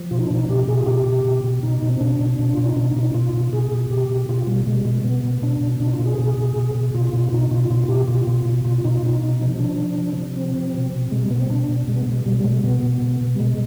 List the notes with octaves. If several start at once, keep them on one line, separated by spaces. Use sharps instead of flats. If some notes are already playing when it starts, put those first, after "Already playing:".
Already playing: F3
B2 F4
D#4
D4
B2 D#4
B2 G4
B2 G#4
F4
B2 G4
B2
B2
B2
B2 D#4
B2
C4
B2 D4
B2
B2 D4
B2 F4
D#4
B2 D4
D#4
B2
D#4
B2 F4
B2
B2 G#4
B2
B2 G4
B2
B2 F4
B2 G3
B2 G#3
G3
B2 G#3
B2 B3
B2
B2 D4
B2
B2 D4
D#4
F4
B2
G#4
B2 G#4
B2
B2
B2
B2 F4
F4
B2
F4
B2 D#4
B2 F4
B2 F4
B2 G4
B2 F4
B2 F4
B2
B2 F4
B2 D#4
F4
B2 D#4
C3
F3
F3 D4
F3
C3
C3
F3 C4
C3
B2
B2
B2 G#3
G3
B2 B3
C4
B2 D4
B2
B2 G#3
B3
G#3
B2
B2 G3
G3
B2 G#3
B2 B3
B2
B2
B2
G3
B2 G#3